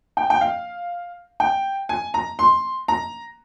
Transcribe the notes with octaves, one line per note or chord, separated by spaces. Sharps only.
G5
G5
F5
G5
G#5
A#5
C6
A#5